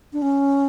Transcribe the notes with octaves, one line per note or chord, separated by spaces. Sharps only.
D4
C#4